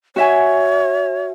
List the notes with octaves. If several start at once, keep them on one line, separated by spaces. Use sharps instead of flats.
F#4 C#5 E5 G#5